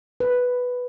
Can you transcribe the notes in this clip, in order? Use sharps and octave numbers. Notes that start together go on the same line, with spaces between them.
B4